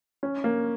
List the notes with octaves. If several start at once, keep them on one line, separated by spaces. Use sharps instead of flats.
C#4
A#3